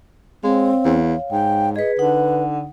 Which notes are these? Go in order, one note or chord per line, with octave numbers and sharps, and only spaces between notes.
G#3 C4 C#5 F5
E2
G#2 G5
G#4 B4 D#5
D3 D#4 B4 F#5